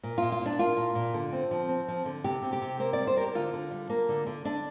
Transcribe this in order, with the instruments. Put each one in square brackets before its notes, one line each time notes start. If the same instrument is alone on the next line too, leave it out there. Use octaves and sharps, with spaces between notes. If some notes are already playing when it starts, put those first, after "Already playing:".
[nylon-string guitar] A#2
A#2 F4
F4
A#2 D4
A#3 F4
A#2
A#2
D3
C4
F3
C4
F3
D3
C3 G4
C3
G4
C3
A#3 C5
G3 D5
C5
A#3 A#4
G4
D3 F4
D3
G3
A#3
D3
D3
D3 D4